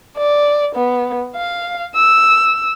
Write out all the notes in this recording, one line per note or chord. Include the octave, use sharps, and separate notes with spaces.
D5
B3
F5
E6